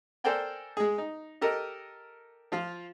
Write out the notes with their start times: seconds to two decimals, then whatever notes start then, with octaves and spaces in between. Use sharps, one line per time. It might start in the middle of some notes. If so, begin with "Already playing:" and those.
0.24 A4 A#4 C5 D5 G5 G#5
0.77 G#3 G#4
0.98 D#4
1.41 G4 A4 A#4 D#5
2.52 F3 F4 F5